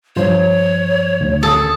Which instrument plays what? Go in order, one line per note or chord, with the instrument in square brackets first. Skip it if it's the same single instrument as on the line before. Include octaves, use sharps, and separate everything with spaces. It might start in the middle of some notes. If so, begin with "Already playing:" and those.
[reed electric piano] G2 F3 C5 [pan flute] C#5
[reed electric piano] D2
[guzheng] A4 [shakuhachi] D#6